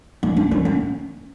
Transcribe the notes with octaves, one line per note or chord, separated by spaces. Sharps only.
C4
D4
C#4
C#4